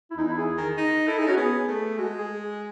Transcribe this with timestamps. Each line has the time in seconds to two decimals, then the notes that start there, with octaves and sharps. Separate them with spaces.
0.11 E4
0.17 E2 D#4
0.27 E4
0.38 G#4
0.57 D#3
0.78 D#4
1.07 E4 A4
1.18 D#4 G#4
1.27 C#4 F#4
1.37 B3 G#4
1.68 A3
1.97 G#3 F#4
2.18 G#4